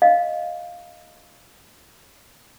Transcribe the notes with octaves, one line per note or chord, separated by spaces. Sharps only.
D#5 F5